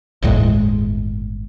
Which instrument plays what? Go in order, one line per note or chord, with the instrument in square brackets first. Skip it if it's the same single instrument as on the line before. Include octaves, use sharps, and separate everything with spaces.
[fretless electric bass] G1 D#2 A2 G#3